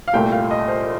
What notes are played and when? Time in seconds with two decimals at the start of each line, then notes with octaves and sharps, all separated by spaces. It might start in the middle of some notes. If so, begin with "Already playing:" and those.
0.08 F5
0.13 C2 A#2 A3 G5
0.32 F5
0.51 D#5
0.68 C5